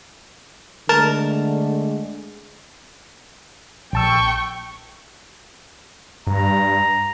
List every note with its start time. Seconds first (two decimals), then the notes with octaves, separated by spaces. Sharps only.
0.89 D3 G#3 A3 A#4 A5
3.93 A#1 G5 A5 C#6 E6
6.27 G2 A#5